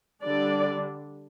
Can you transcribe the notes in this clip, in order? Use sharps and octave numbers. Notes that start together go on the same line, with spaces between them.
D3 G3 D4 D5